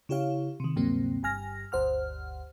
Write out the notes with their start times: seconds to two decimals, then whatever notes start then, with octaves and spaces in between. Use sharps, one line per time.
0.09 C#3 E4 G4 C#5 F5
0.60 C3 D#3
0.76 D2 G2 C3 F#3 A#3 C4
1.23 G1 G2 G#5 F6 A#6
1.72 G1 D2 C5 F#5 F6